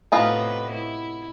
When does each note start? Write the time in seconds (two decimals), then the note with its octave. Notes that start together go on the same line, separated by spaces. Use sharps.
0.12 A2 C3 B3 D#4 F4 B4
0.72 E4